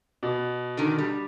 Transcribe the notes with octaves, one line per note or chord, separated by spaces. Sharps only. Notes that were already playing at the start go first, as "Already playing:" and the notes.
B2
D3 D#3
G3